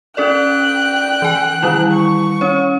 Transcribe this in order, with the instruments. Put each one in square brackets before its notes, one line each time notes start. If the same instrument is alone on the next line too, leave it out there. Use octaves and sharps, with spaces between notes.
[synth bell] C#4 A4 D5 [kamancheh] G5 F#6
[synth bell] E3 G#5
D#3 G3 E4
[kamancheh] C#6
[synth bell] C#4 C#5